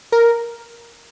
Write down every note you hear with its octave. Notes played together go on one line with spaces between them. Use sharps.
A#4